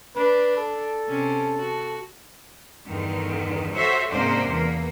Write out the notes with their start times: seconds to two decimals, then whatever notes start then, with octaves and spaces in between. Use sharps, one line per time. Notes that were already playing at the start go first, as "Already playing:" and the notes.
0.16 D4 B4
0.57 A4
1.09 C3 C#4
1.58 F#4
2.87 E2 G2 D3 D#3
3.74 F#4 A4 C5 C#5 E5
4.09 G#2 C3 A#3 C#4 D4 C5
4.50 E2 A#3